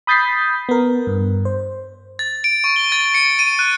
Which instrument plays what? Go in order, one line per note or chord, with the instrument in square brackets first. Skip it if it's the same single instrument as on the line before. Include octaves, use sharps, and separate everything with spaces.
[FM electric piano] B5 D#6 G6 A6 B6 C7
B3 A#4
G2
C5
[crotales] A6
D7
C#6
G7
A6
C#7
D#7
F#6